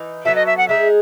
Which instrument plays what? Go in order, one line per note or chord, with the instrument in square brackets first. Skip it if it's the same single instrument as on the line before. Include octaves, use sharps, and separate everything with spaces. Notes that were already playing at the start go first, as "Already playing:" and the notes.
Already playing: [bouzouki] E3 D#4
[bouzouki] F#3 B3 F#4 A4 [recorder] E5
[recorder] D#5
E5
F#5
[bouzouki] G#3 D#4 G#4 [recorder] E5